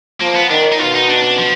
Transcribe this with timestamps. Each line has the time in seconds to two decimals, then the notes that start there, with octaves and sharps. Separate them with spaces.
0.21 F3 A#3
0.36 B3
0.50 D#3 D4
0.72 D#4
0.79 B2 F4
0.95 D#4
1.09 D4
1.24 D4
1.38 F3